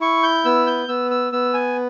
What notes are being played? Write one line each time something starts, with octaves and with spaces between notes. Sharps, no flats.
E4 C#6
G6
B3 E6
G6
B3 E6
E6
B3 E6
G#5